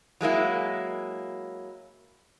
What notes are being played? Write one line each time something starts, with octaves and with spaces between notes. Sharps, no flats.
F#3 G#3 A#3 E4